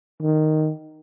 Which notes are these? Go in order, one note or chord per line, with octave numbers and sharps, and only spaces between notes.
D#3